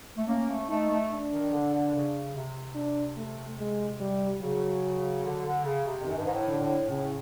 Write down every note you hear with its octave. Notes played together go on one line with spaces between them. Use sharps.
A3
A#3 C#4
A3
A3 D#4
A3
D4
D#3
D3
D3
C#3
C3
D4
A3
G#3
G3
C#3 F#3
D3
D3
C#3
C3
F2
F#2 D#3
G2
G#2
A2
D3
A2
A2 C#3